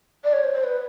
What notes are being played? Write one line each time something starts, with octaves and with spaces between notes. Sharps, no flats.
D5
C#5
C5
C5
B4